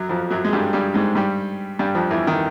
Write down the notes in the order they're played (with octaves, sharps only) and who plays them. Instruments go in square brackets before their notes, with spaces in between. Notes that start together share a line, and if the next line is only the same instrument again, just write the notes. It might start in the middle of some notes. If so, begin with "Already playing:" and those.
Already playing: [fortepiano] F#2 F#3
F2 F3
F#2 F#3
G#3
G2 G3
G2 G3
G#2 G#3
G2 G3
G2 G3
F2 F3
E2 E3
D#3